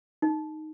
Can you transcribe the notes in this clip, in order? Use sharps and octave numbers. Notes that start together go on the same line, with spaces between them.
D#4